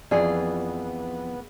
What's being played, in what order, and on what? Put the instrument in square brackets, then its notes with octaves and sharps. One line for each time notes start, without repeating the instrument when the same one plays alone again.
[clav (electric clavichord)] F2 E3 [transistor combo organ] B3 [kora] F4 G#4 [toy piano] D5